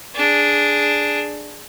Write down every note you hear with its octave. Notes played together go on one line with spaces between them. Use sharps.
D4 G#4